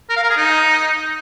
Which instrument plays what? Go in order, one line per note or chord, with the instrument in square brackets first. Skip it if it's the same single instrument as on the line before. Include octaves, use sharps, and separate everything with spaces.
[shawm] A#4
F5
A#4
G#4
D#4